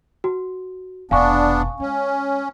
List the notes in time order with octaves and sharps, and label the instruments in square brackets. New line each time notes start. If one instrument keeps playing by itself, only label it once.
[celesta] F#4
[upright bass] F1 B2 [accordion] B3 D4 [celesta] F5 G#5 C#6
[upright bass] G#3 [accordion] C#4